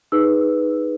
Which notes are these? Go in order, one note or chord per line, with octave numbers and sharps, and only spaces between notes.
D#4 G#4 B4 E6